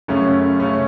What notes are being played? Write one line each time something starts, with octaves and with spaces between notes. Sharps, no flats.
F#2 C#3 A3 C#4
C#3 A3 C#4